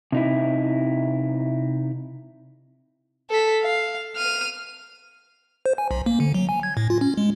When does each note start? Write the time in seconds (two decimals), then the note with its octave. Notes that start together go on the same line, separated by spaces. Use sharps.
0.12 C3 D#4 E4
3.30 A4 B6
3.63 F5
4.16 F6 D#7
5.66 C5
5.78 G#5
5.91 B1
6.06 A#3
6.20 D3
6.34 F#3
6.49 G#5
6.63 G#6
6.77 A2
6.90 F4
7.01 C#4
7.17 G#3